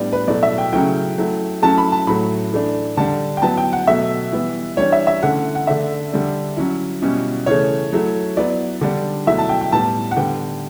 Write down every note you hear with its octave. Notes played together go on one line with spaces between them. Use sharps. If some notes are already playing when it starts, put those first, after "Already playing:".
Already playing: A2 G3 B3 D4 D5
B4
B2 F#3 A3 E4 D5
E5
G5
C#3 F#3 A3 C#4 E4 G5
F#3 A3 E4
F#3 A3 C#4 E4 A5
B5
A5
A2 F#3 A3 B5
E3 A3 D4
D3 G3 D4 A5
G5
F#3 B3 E4 A5
G5
F#5
B2 F#3 A3 E5
E3 G3 B3 E4
E3 G3 D4 C#5
E5
E5
D3 A3 C#4 E4 F#5
F#5
D3 A3 D4 E5
D3 G3 D4
F#3 C#4 E4
B2 G3 C#4 E4
C#3 E3 A3 C#5
F#3 A3 E4
F#3 B3 E4 D5
D3 G3 D4
B2 F#3 A3 E4 E5
A5
G5
G5
A2 G3 B3 E4 A5
F#5
D3 G3 B3 G5